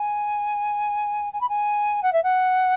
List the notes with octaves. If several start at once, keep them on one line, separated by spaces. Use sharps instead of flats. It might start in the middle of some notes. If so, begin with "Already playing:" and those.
Already playing: G#5
G#5
B5
G#5
F#5
E5
F#5